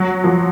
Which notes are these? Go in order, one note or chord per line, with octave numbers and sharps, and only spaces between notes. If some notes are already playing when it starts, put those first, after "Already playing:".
Already playing: F#3
F3